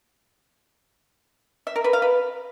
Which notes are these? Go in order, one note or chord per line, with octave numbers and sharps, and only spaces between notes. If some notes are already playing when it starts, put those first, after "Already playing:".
E5
A#4
B4
F5
B4